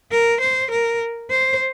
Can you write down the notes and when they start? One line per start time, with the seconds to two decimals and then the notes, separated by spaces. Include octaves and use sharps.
0.11 A#4
0.41 C5
0.71 A#4
1.31 C5